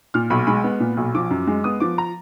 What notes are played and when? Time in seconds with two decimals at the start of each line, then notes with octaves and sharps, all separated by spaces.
0.14 A#2 F6
0.30 B1 B5
0.47 G#3 B5
0.64 B3
0.80 A#2
0.97 B1
1.15 F3 D6
1.30 F#2
1.47 G#3
1.64 B3 D#6
1.80 F3 D6
1.98 A#5